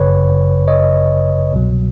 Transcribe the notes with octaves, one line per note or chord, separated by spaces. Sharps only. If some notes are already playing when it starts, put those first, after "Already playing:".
Already playing: G1 F#2 C#3 B4 C#5
C#5 D#5
C2 B2 F#3